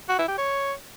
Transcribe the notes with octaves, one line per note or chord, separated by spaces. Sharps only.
F#4
E4
G4
C#5